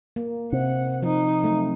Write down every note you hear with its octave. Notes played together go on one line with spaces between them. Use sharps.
A#3
C3 F#5
F3 D#4
F#3 A3 C4